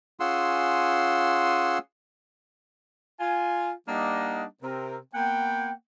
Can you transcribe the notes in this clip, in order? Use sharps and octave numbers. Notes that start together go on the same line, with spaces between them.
C#4 F4 G#4 F#5 C6 E6
F4 G#5
G3 A#3 D4 D#4 D#5 F#5
C3 C4 A#4
A#3 B3 F#5 G5